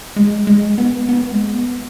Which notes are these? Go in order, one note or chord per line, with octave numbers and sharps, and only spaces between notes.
G#3
G#3
B3
B3
G#3
B3